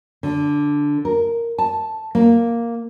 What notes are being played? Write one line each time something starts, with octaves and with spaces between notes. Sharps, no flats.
D3
A#4
A5
A#3